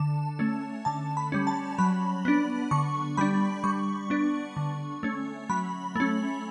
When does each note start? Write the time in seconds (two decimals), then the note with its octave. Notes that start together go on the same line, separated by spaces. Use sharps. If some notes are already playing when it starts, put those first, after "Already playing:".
Already playing: D3 A5
0.39 A3 C#4
0.85 D3 A5
1.17 B5
1.32 G3 C#4
1.47 A5
1.78 F#3 B5
2.25 B3 D4
2.71 D3 C#6
3.17 G3 D4 B5
3.64 G3 C#6
4.10 B3 D4
4.56 D3
5.03 A3 C#4
5.50 F#3 B5
5.96 A3 C#4